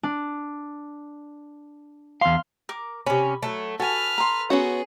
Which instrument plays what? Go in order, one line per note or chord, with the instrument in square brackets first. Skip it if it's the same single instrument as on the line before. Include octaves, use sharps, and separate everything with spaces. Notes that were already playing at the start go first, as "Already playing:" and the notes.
[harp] D4
[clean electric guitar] E2 F5 [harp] C6 F6
[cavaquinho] A#4 D6
[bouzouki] C3 C#4 [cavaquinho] B5
[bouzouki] F#3 G#3 A3
[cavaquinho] F#4 G#5 [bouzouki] A4 [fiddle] B4 F6
[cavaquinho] A#5 C6
[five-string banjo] B3 C#4 F#4 [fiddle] G#4